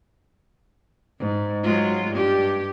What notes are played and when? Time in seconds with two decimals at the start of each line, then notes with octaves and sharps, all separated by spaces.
1.19 G#2
1.63 F#3 G#3 F4
2.12 G2 G4